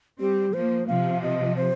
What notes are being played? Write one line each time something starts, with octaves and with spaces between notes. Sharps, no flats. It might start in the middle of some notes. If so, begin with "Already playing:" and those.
G3 C4 G4
F3 A#3 C5
C3 F3 F5
D#5
C5